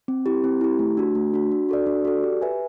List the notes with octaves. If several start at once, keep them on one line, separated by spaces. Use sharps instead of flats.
C4
E4 G4
C4
E4 G4
A3
D4 F#4
A3
D4 F#4
D4
F#4 A4 D5
D4
F#4 A4 D5
G4
B4 E5 G#5